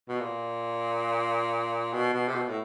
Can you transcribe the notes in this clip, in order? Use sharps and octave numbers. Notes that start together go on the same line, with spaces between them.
B2
A#2
B2
B2
C3
B2
A2